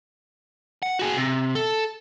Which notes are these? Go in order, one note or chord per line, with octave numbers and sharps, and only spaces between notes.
F#5
F#4 G#4
C3
A4